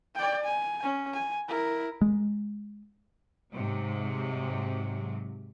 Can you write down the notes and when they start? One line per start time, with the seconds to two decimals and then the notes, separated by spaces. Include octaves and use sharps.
0.15 D5 G5
0.44 G#5
0.83 C#4
1.14 G#5
1.48 E4 A#4
2.01 G#3
3.54 G#2 C3 F#3